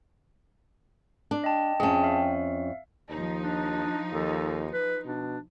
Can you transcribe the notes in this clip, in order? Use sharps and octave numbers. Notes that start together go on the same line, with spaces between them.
D4
D#5 G5 A5
F2 C#4 G#4 E5 A5
E5 F5
D#2 F3 D#4
D4
D#2 A4
B4
B2 D4